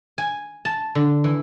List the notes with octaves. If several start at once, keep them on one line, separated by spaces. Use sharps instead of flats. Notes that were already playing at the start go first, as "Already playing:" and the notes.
G#5
A5
D3
E3